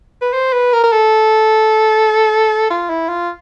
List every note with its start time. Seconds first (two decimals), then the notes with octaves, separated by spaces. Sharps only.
0.21 B4
0.33 C5
0.53 B4
0.73 A#4
0.84 A#4
0.92 A4
2.70 F4
2.90 E4
3.09 F4